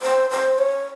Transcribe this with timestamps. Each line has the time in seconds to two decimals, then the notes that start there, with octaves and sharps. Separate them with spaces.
0.02 C5
0.31 C5
0.58 C#5